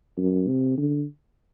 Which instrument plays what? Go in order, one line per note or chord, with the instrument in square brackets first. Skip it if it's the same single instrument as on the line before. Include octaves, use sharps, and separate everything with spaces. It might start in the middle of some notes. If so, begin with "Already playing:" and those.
[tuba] F#2
C3
D3